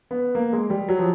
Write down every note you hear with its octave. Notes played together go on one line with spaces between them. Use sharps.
B3
A#3
G#3
G3
F#3
F3